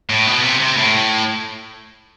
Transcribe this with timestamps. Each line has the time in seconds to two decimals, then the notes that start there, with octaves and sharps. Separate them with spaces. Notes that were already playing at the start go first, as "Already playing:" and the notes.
0.10 A2
0.27 B2
0.43 C3
0.60 C3
0.77 A2